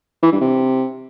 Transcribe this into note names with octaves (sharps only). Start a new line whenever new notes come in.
E3
G2
C3